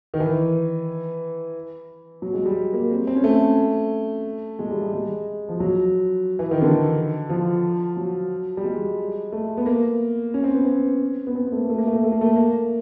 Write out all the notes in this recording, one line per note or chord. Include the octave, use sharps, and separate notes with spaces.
D#3
E3
F#3
G#3
G3
A#3
C4
C4
C#4
A3
G#3
G3
G3
G#3
F3
F#3
E3
D#3
D3
F3
F#3
G3
G#3
A3
B3
A#3
C#4
C4
B3
C4
B3
C4
B3
A3
A#3
A3
A#3
A3
A#3
A3
A#3
A3
A#3